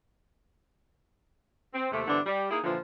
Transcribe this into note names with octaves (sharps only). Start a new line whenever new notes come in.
C4
D#2 C3 A3
G2 D3 E3 B3 C4 D4
G3
A#3 D#4 E4 G#4
A#2 D3 E3 F3